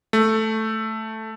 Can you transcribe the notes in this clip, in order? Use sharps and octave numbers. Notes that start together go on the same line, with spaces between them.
A3